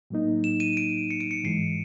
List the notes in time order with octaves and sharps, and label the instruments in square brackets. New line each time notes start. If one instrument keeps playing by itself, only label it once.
[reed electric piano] A2 F#3 A#3 D#4
[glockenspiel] E7
D#7
D7
C#7
D7
C#7
[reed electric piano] G#2 E3 G#3 [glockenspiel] C7